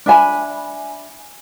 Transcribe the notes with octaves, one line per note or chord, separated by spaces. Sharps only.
D4 E5 G#5 B5